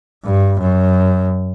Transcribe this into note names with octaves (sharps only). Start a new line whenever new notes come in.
G2
F#2